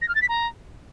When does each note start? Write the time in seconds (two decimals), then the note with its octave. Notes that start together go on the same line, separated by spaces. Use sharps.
0.02 A#6
0.08 F6
0.15 A6
0.22 B6
0.29 A#5